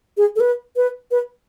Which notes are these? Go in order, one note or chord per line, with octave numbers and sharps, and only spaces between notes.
G#4
A4
B4
B4
B4